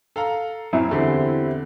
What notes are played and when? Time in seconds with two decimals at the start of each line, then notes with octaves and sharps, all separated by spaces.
0.16 A4 F5 A#5
0.73 F#2 F#3 C4 E4
0.91 E2 D3 C4 G4 C5